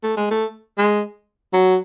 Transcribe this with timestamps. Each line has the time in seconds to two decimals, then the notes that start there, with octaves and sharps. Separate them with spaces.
0.03 A3
0.17 G#3
0.31 A3
0.78 G#3
1.53 F#3